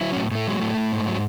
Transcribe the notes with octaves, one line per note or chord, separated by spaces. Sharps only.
F#3 E4
C#4
A2
A2 A3
F#3 G#3
A2 A3
A2
G#2
F#3